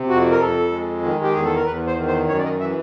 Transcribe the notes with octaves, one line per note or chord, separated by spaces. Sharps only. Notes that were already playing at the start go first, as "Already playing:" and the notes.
Already playing: C3
F2 F#4
A#4
F2 A4
G#3
D#3
G4
E2 G#4
A4
A#4
E2 B4
C5
D#3
C5
F#2 C#5
D5
D#5
E3 E5